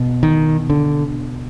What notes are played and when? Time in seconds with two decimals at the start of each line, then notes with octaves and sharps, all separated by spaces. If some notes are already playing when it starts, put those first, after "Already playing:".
Already playing: B2
0.23 D#3
0.70 D3